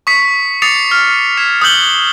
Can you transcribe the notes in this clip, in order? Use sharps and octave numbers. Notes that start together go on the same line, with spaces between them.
C#6 D#6 B6 C#7
D6 D#6 A6 C7 C#7 F7
F6
G#6 B6 C7 E7
D#6 E6 F#6 G6 F#7 G7